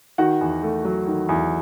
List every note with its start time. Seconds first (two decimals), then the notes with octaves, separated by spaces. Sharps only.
0.18 D#3 F#4 F#5
0.41 E2
0.63 A3
0.85 F#3
1.07 D#3
1.29 E2